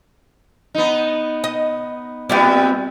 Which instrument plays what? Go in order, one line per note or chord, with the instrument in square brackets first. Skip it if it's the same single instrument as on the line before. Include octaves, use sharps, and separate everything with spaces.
[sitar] B3 D#4
[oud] D#5
[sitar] A#2 G3 B3 [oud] C4 E4 D5